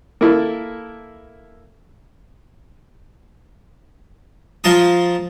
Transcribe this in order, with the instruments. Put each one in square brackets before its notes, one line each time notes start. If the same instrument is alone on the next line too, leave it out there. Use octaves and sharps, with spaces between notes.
[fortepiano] A#3 E4 A4
[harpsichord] F3 F4 A5 A#5 D#6